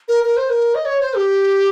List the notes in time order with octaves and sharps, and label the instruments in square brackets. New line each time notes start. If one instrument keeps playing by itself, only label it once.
[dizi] A#4
A#4
C5
A#4
D#5
C#5
C5
G4